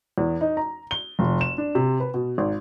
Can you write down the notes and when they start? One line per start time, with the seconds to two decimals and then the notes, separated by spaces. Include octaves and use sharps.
0.18 E2
0.41 D#4
0.57 A#5
0.91 G7
1.19 F1
1.41 E7
1.58 D4
1.75 C3
2.00 B4
2.14 B2
2.38 G#1